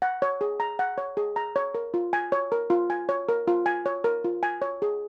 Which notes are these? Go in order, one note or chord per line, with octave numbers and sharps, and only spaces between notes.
F#5
C#5
G#4
A#5
F#5
C#5
G#4
A#5
C#5
A#4
F4
G#5
C#5
A#4
F4
G#5
C#5
A#4
F4
G#5
C#5
A#4
F4
G#5
C#5
G#4